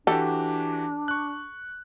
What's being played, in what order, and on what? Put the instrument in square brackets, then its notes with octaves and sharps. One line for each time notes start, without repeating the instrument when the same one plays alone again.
[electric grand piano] E3 F#4 G4 [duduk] D4 [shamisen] A4
[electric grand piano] C#6 F#6